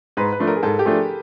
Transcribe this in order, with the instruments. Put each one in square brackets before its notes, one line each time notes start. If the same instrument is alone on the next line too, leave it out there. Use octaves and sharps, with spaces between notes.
[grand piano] G#2 [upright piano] B4
[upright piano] B4
[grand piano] F3 A3 D4
[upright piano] A#4
G#4
[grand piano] G#2 [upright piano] A4
[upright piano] G4
[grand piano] F3 A3 D4 [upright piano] G#4